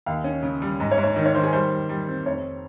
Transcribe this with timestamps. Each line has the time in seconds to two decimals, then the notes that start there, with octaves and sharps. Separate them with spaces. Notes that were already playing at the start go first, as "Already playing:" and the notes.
0.06 D#2 F5
0.24 C#4
0.43 C#3
0.62 G3
0.80 G#2 D#5
0.91 C#5
0.98 G#2
1.03 C#5
1.16 D#3 D#5
1.26 C#5
1.34 D#3 C5
1.44 G#4
1.53 G3 C5
1.71 G3
1.89 G3
2.08 C4
2.25 F1 C#5